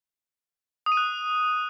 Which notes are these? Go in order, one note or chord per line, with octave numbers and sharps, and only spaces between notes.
D#6
D#7
F#6